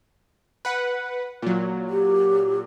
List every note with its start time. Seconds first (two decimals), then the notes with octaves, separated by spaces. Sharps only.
0.65 B4 F#5
1.42 A#2 F#3
1.89 G4